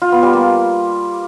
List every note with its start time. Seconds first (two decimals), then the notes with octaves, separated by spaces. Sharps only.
0.02 F4
0.12 B3
0.23 G3
0.33 A#3